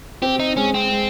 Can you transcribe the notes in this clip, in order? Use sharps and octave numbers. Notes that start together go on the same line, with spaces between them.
C4 G4
D#4
G#3 C#4
C4
G#3